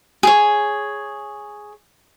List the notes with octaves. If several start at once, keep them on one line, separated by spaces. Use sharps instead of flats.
G#4 C#5